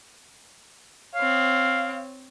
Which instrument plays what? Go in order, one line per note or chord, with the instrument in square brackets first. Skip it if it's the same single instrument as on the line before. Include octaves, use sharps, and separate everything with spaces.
[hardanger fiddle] C4 C#5 [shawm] F5